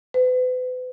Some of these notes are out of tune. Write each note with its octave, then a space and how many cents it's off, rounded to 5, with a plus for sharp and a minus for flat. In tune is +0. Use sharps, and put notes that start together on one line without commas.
B4 +40